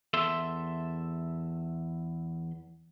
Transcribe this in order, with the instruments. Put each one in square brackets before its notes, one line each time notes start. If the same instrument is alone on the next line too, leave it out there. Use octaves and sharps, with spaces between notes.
[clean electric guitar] E2 A4 E5 C6